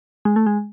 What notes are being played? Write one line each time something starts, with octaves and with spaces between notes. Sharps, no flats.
G#3
A3
G#3